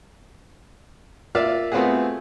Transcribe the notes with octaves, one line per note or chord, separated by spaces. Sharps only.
A#3 F4 D5 E5 F5
A3 B3 C4 F4 F#4 G#4